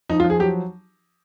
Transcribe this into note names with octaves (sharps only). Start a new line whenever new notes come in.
F3 D#4
F4
F3
G#4
F#3 G4